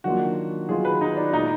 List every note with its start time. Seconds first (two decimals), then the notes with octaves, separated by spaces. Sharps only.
0.04 D#3 F#3 A#3 D4 F4 F#4
0.69 D#3 F#3 B3 F4 G#4
0.85 B4
1.01 D#4
1.17 D4
1.33 A#2 G#3 B3 D#4 F4